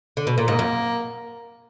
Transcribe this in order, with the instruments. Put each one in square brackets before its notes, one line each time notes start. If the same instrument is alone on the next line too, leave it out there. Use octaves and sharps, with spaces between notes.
[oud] D3
B2
A#2
[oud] G#2 [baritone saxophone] A#3
[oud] F#2